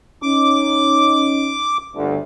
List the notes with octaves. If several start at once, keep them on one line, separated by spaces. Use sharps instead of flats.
C#4 D#4 D6
G1 D2